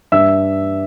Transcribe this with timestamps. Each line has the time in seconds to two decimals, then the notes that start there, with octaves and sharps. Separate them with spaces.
0.12 G2 E5 E6